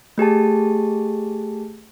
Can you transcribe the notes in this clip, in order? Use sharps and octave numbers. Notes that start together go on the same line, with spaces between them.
A3 G4 G#4 A5